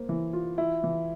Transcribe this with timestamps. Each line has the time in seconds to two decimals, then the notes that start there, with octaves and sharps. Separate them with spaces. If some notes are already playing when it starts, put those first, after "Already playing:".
Already playing: A#3 C5
0.09 E3
0.33 F4
0.58 E4
0.84 E3